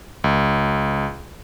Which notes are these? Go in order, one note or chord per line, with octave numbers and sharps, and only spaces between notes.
C#2